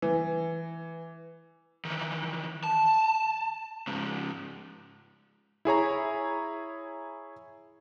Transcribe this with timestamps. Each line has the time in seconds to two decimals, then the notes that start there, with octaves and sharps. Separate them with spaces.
0.02 E3
1.85 D#3 E3
2.64 A5
3.87 G#2 C#3
5.65 E4 G#4 C#5 A#5